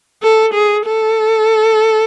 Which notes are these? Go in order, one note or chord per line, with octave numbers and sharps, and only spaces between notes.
A4
G#4
A4